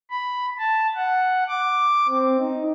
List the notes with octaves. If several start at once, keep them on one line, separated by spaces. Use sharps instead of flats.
B5
A5
F#5
D6
C4
D#4